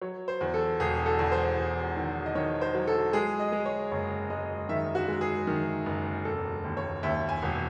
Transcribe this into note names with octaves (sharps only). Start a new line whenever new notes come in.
F#3 C#5
C5
E2
A4
E1 G#4
A4
E2
C5
E1
D#3
D#5
D#3 C#5
C5
F#3
A4
G#3 G#4
D#5
G#3
C#5
F#1 C#5
G#3 D#5
D#3 E5
F#4
G#3
G#4
D#3
F#1
E1 A4
D#2
C#5
D#2 E5
G#5
E1